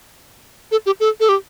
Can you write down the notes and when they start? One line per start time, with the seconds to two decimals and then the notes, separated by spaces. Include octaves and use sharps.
0.72 A4
0.86 G4
1.00 A4
1.20 A4
1.29 G4